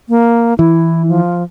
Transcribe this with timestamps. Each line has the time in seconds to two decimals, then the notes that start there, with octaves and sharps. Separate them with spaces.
0.09 A#3
0.59 E3 E4
1.08 F3